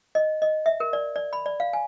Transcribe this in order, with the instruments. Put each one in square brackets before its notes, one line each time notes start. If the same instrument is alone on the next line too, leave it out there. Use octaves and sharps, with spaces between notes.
[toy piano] D#5
D#5
E5
A#4
D5
D5
B5
D5
F5
G#5